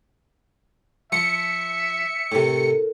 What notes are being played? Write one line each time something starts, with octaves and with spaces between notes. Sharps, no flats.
F3 E5 C#7
A2 C3 E4 A4 A#4